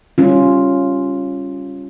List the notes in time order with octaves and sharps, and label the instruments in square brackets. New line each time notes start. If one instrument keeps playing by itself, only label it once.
[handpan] G3 C#4 F4